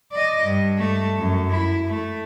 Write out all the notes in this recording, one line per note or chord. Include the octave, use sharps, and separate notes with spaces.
D5 D#5
G2
A3
F#2
E4
A3